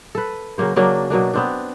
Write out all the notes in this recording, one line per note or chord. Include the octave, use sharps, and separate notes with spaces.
A4 B4
C#3 F#3 A#3 C5
C#3 F#3 A#3 D4
B2 F#3 A#3 D4
B3 C4 D4